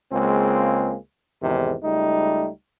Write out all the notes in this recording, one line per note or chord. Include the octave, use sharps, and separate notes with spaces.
C#2 G#3 A#3 C4
E2 G#2 C3 D#3
C#2 G3 A3 D#4